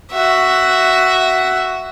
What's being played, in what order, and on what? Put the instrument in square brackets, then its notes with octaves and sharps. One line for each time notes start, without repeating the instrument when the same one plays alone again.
[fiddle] F#4 E5